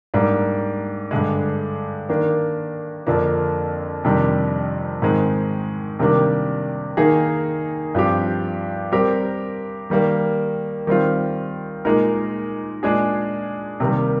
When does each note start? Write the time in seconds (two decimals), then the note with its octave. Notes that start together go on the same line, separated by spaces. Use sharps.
0.14 G#2 G3 A#3 D4
1.11 G2 D3 G#3
2.09 D#3 A#3 D4
3.07 F2 D3 F3 A#3 D4
4.04 F2 C3 D#3 G3 D4
5.02 G#2 D#3 G#3 C4
5.99 C3 D#3 G3 A#3 D4
6.97 D#3 A#3 D#4 G#4
7.95 G2 F3 C4 G4
8.92 G3 C4 G4 A#4
9.90 D#3 G3 A#3
10.87 D#3 G3 C4 F4
11.85 A#2 G#3 D#4 A#4
12.83 A#2 G#3 D4 G#4
13.80 C3 D#3 G3 A#3